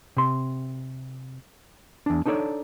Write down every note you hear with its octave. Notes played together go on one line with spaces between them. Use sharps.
C3 C6
E2 D4
D4 D#4 A4 C#5 D5